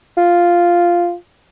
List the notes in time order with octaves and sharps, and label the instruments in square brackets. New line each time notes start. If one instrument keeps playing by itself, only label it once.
[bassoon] F4